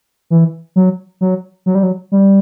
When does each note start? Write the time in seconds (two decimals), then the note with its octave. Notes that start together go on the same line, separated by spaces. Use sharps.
0.30 E3
0.76 F#3
1.21 F#3
1.66 F#3
1.75 G3
1.83 F#3
2.12 G3